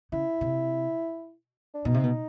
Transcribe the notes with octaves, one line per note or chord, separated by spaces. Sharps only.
C#3 E4
C3
D4
B2 D#4
C3
B2